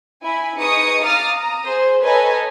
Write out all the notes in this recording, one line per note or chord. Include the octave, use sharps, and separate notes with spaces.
E4 G#5 B5
D#4 G#4 B4 C#6 D#6 C#7
F5 A#5 D6 D#6 F6 A6
A#5 D#6
G#4 C5
A4 B4 C#5 D#5 G#5 A#5